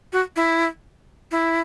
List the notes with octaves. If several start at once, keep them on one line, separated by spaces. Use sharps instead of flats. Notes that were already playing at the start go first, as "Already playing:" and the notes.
F#4
E4
E4